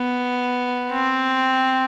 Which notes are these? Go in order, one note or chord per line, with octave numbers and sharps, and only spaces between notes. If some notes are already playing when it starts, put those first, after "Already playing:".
Already playing: B3
C4